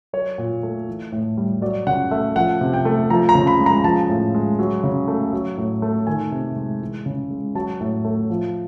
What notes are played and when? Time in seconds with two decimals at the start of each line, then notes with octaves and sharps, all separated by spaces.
0.13 F#3 C#5
0.38 A#2
0.63 A3
0.88 E3
1.12 A2
1.37 G3
1.61 F#3 D5
1.87 C#3 F#5
2.11 A3 E5
2.36 F3 F#5
2.61 C3
2.73 G5
2.85 A3
3.10 F3 A#5
3.29 A#5
3.35 C#3
3.47 B5
3.59 G#3
3.66 A#5
3.84 F3 A5
4.09 A2
4.34 G#3
4.59 F#3
4.84 C#3
5.08 A3
5.33 F#3
5.57 A2
5.82 A3
6.07 D#3 G#5
6.32 C3
6.57 G#3
6.81 E3
7.06 C#3
7.30 G#3
7.55 F#3 A5
7.81 A2
8.05 A3
8.30 F3